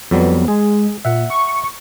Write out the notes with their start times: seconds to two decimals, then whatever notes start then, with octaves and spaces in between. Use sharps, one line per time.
0.11 F2 F#3 G3 B3
0.48 G#3 G#4
1.05 A#2 E5 F#5
1.30 C#6